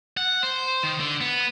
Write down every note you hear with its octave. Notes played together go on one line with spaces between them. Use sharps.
F#5
C5
D#3
D3
B3